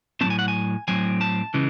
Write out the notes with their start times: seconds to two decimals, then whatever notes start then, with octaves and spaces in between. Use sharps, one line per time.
0.21 A2 F#3 C4 A5
0.30 G#5
0.39 F#5
0.48 G#5
0.88 A2 F#3 C4 G#5
1.21 A5
1.54 C#3 E3 G#3